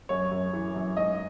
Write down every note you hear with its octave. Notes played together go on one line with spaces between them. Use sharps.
F#2 C#5
F#2
E3
F#2
G#2 D#5